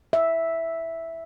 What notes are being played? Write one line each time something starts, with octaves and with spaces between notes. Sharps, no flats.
E5